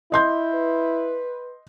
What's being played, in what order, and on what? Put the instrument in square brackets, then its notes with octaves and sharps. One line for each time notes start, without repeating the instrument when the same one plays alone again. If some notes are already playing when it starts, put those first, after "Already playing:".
[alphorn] E4 [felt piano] D#5 C6 G6
[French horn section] B4